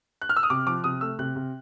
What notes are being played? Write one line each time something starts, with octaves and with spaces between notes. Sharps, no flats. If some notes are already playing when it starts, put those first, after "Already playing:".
F#6
F6
E6
D#6
C3 D6
F3 D6
C3 D#6
A3 E6
C3 F#6
C3